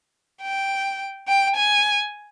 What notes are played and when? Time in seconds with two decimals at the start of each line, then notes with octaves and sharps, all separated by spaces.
0.42 G5
1.28 G5
1.56 G#5